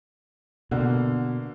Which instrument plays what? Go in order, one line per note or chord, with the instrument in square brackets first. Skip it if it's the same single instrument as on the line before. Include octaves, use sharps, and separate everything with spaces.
[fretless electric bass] B2 [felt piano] D3 A#3